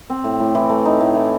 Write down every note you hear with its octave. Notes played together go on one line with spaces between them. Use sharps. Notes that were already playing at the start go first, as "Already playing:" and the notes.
C4
A2
A2
E3
A3
D#4
A2
E3